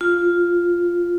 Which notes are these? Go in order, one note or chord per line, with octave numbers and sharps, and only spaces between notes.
F4